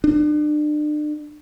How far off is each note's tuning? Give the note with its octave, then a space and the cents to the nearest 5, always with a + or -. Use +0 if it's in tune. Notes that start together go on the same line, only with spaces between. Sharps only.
D4 +40